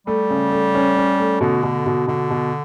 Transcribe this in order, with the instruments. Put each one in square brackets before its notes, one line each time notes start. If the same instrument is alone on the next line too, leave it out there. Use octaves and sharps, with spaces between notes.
[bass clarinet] G3 [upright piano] A3
[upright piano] C#3
A3
C#4
C#4
A3
[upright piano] B2 [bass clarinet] D3
[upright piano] B2
B2
[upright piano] B2 [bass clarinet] D3
[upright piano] B2